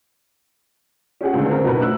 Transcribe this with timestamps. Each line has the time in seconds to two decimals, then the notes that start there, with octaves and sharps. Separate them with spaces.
1.21 C#4 G4 G#4 F#5
1.34 C#2 A2 D3
1.49 C4 A#4
1.64 B1 F#2 B2 D#4 A#4 B4
1.81 A3 D4 E6 F#6